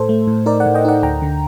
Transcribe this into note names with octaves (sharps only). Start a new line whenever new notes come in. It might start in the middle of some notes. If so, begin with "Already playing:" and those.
Already playing: A2 A4 C5
A3
A2
D#4 A#4 D5
D5 F#5
A2
D#5 G5
D#4 D5 F#5
D2 G5 A#5
D3